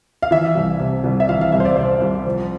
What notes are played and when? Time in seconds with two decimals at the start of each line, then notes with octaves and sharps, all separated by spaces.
0.22 F5
0.31 E3 E5
0.55 C2
0.79 C3
1.04 C2
1.20 E5
1.29 E3 F5
1.41 F5
1.52 C2 E5
1.60 C5
1.65 D5
1.76 C3 C5
2.02 C2
2.26 F3